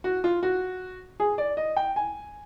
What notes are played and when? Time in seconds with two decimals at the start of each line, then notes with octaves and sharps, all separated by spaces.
0.04 F#4
0.24 F4
0.43 F#4
1.20 G#4
1.38 D5
1.57 D#5
1.77 G5
1.96 G#5